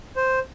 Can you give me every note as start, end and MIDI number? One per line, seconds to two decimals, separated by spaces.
0.16 0.39 72